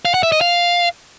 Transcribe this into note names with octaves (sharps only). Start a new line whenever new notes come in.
F5
F#5
E5
D#5
F5